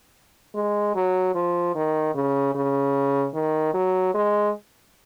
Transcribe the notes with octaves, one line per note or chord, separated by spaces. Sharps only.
G#3
F#3
F3
D#3
C#3
C#3
D#3
F#3
G#3